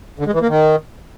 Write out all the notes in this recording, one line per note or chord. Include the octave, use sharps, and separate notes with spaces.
D3
G#3
E3
A#3
D#3